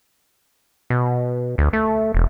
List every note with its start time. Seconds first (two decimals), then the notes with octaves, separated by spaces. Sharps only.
0.90 B2
1.58 D2
1.73 A3
2.14 E1